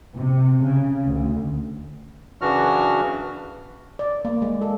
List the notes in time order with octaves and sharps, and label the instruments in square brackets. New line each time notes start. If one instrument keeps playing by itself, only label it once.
[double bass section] C3
C#3
D2
[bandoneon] F#2 C#3 E3 D4 F#4 F6
[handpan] D5
A#3
G#3
A4